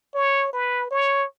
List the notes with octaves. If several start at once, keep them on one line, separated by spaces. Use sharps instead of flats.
C#5
B4
C#5